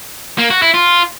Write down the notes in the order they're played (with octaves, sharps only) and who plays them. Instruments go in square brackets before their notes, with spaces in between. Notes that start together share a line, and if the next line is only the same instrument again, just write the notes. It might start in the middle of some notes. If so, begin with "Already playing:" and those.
[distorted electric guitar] A#3
F#4
E4
F4